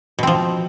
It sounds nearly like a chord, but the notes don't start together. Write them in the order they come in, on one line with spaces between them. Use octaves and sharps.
B2 C4 F3